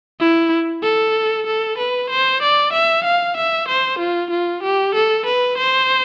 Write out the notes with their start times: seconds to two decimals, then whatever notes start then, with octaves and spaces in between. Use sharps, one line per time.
0.20 E4
0.83 A4
1.46 A4
1.78 B4
2.10 C5
2.42 D5
2.73 E5
3.04 F5
3.37 E5
3.68 C5
3.99 F4
4.31 F4
4.63 G4
4.94 A4
5.26 B4
5.58 C5